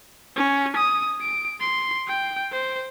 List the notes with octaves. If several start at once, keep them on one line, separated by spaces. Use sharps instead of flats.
C#4
D#6
D7
C6
G5
C5